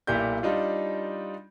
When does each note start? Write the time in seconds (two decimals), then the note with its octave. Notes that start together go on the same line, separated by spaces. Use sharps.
0.07 B1 A#2 E4 G4 D5 G6
0.43 G3 D4 D#4 F4